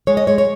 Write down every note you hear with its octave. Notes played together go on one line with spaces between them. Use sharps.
G#3 C#5
D#5
G#3 C#5
C#5